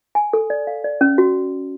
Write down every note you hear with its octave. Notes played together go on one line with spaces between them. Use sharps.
G#5
A4
D5
F5
D5
C#4
F#4